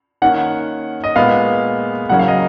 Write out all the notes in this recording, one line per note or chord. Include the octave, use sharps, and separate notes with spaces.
D#3 A#3 C#4 F#5
D#5
A#2 G#3 B3 F5
C#3 F#3 A#3 C#4 F#5
F5
D#5